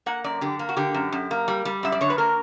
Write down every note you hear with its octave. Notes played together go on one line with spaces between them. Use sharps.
A#3 F#5
F#2 D5
D3 G4
A#3
F#4
D3 G4
F#2
F#2
A#3
G3
G3
F#2 E5
D5
D3 C#5
B4
A#3 A#4